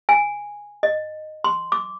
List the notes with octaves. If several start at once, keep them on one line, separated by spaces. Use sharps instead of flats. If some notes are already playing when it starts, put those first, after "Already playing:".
G#5
D#5
C6
D6